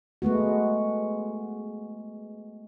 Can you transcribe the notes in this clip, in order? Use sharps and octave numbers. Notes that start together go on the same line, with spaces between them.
G#3 A3 B3 F#4